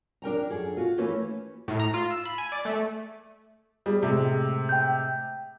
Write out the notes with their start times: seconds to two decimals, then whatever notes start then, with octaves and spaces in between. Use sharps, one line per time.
0.22 D4 A#4 G5 A#5
0.50 F#2 G#4 A4
0.77 F4 F#4
0.97 E3 A3 A#3 C#4 E4 B4
1.68 A2
1.79 A#5
1.94 F4
2.10 E6
2.25 B5
2.38 G#5
2.52 D5
2.65 A3
3.86 G3 G#4
4.02 A2 C3 G#3
4.69 G5 G6